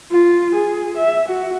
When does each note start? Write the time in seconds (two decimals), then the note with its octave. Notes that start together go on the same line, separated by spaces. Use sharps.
0.11 F4
0.55 G#4
0.97 E5
1.28 F#4